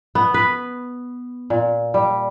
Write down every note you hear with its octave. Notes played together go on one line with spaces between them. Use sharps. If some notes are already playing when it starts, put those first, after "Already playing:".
B3
B4
A#2
G3